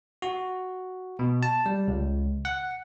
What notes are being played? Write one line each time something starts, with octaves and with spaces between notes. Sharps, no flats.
F#4
B2
A5
G3
C#2
F#5